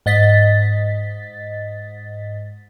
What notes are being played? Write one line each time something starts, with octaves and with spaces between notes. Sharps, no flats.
G#2 D#5 A6 B6